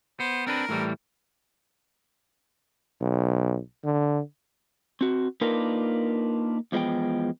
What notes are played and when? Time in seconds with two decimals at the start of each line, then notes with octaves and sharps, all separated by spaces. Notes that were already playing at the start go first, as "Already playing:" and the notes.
0.20 B3 C5
0.47 C4 D4 A#4 B4
0.69 A2 E3 G3
3.01 B1
3.84 D3
5.01 C4 F#4
5.41 A#3 D4 D#4 F4 A#4 B4
6.72 E2 F3 G#3 B3 G5